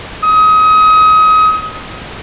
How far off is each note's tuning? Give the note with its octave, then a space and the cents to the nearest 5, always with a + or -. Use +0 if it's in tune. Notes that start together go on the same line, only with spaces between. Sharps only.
D#6 +30